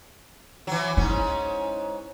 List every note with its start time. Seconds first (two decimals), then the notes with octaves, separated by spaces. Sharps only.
0.67 E3 F#3
0.97 G#2 C#4 E4